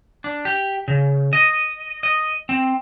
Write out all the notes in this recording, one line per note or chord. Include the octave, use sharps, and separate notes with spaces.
D4
G4
C#3
D#5
D#5
C4